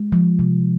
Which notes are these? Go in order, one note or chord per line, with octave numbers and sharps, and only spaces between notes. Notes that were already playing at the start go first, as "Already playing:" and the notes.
Already playing: G#3
F3
C3